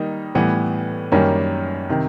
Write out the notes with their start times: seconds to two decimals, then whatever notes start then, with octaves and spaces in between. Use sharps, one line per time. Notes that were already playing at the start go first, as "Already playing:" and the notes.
Already playing: D#3 G3 A#3 D#4
0.35 A2 E3 G3 B3
1.12 F#2 D#3 G3 A#3 C#4
1.89 C3 D#3